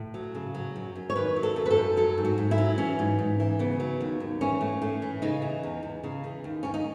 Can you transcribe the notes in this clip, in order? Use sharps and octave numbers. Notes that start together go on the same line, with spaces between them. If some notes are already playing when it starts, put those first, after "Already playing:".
Already playing: A2
F#3
C#3
F#3
F#2
F#2
C#5
D#3 B4
F#3
A4
F#2
B4
A4
F#2
F#3 A4
G#2
F#4
G#2
E4
F#3
E3 C#4
G#2
G#2
E3
C#3 B3
F#3
D#2
D#2
E3 C#4
A2
A2
E3
C#3 D#4
E3
E2
E2
C#3
E3
D#2
D#2 C#4
D#4